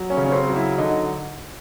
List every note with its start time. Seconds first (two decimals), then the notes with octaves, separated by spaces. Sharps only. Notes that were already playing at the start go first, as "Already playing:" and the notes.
Already playing: F#3
0.10 C#4
0.17 C#3
0.25 C#4
0.32 C4
0.49 F#3
0.56 E4
0.78 D3 D#4